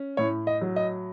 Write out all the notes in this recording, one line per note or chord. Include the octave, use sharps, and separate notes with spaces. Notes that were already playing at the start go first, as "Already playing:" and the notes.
Already playing: C#4
A2 C#5
D#5
F#3
D#5